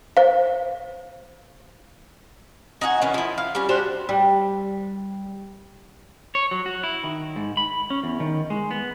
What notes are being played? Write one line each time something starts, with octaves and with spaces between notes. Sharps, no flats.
C5 F5
D#4 F#4 F#5 G#5
D#3 E3 C#4
F3 E4
F5
G3 C#4
D4 F#4 G4 C5
G3
C#5
F#3
F#4
E4
D#3
G#2
B5
C#4
E2
D#3
G#3
B3